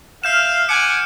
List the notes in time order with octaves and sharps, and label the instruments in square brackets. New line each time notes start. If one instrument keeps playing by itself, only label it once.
[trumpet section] E5 F5 [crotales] F6 G6 E7
[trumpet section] F#5 G#5 D6 [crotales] C#7